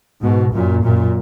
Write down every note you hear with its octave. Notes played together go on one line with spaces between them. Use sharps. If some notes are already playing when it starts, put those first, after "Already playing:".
G#2 B2
F#2 A#2
F#2 A#2